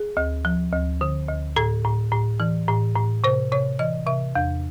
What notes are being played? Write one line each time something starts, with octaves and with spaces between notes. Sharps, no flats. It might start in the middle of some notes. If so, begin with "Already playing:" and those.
Already playing: G#4
D2
F3
D2
D3
D2
A2 A4
A2
A2
E3
A2
A2
C3 C5
C3 C#5
E3 D#5
C3 E5
E2